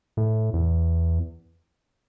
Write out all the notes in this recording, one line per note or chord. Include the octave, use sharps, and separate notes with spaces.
A2
E2